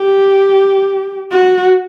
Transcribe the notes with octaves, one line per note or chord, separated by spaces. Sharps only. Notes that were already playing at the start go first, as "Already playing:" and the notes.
Already playing: G4
F#4